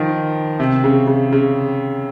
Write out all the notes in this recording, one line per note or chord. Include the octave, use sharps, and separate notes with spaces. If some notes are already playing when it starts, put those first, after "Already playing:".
Already playing: D#3 F3
C3
C#3
C#3
C#3